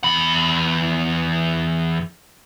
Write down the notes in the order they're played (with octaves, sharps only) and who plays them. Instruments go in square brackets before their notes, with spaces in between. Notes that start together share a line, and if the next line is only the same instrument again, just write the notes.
[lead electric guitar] E2 B5